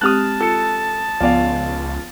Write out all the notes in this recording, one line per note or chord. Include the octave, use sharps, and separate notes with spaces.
G#3 C4 G4 A5 D#6 F6 F#6
F4 A4 C#7
C#2 F3 B3 F4 D5 F5 G5